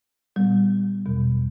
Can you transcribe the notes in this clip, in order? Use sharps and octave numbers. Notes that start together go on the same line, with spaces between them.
A#2 G3 B3
E2 B2 F#3